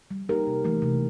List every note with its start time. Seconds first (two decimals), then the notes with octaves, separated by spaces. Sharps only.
0.11 G3
0.29 A#3 D#4 G4 A#4
0.47 C3
0.65 E3 A3
0.82 C3